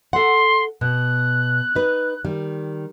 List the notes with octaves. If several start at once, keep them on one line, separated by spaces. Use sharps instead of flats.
A4 F#5 C6
B2 F#6
D#4 B4
D#3 G3